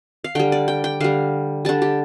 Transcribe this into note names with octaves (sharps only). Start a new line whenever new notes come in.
F5
D3 G3 G5
D5
G5
G5
D3 G3 F5
D3 G3 A5
G4